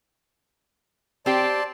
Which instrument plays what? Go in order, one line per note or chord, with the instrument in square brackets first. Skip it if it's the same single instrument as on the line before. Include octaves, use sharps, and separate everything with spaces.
[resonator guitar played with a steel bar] C4 G4 [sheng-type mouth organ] D5 A5 C6